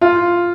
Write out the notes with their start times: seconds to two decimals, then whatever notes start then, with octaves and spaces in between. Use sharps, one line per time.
0.01 F4